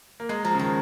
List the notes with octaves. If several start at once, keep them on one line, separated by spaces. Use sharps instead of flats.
A#3
G#3 A#5
F3 A#5
C#3
D#3 A#5